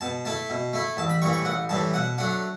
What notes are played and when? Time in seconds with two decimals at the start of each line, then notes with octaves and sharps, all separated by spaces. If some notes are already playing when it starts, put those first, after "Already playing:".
0.01 B2 A5
0.25 A3 E4 A5
0.50 B2
0.73 A3 E4
0.97 A1 A5
1.09 B5
1.22 A2 E3 G3 C#6
1.33 C#6
1.45 A1 F#5
1.69 A2 E3 G3 A5
1.93 B2 F#5
2.18 F#3 A3 D4 F#5